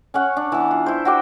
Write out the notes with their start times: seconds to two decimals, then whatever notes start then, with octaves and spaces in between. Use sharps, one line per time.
0.14 C#4 C#5 F#5
0.37 D4
0.52 E3 B3
0.71 F4
0.86 E4 C5
1.05 F#4 G5 D6